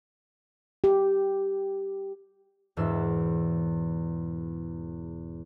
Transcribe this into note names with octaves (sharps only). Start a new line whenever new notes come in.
G4
E1 E2 G#2 C5 E6